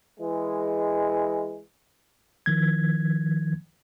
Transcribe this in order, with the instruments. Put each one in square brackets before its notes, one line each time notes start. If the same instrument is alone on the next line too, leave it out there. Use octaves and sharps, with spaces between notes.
[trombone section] E3 G#3
[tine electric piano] D#3 F3 G#6